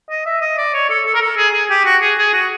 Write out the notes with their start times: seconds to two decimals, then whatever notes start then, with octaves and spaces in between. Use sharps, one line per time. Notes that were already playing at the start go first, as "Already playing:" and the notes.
0.10 D#5
0.26 E5
0.42 D#5
0.58 D5
0.74 C#5
0.90 A4
1.06 A4
1.15 A#4
1.22 A4
1.37 G#4
1.53 G#4
1.70 G4
1.85 F#4
2.02 G#4
2.18 G#4
2.34 F#4